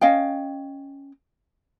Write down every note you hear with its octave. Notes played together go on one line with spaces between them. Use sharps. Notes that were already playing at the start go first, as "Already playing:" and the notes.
C#4 D#5 F5 G5